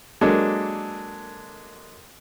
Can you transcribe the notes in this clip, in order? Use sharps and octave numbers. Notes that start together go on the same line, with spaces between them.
F#3 G#3 A#3 D4 A4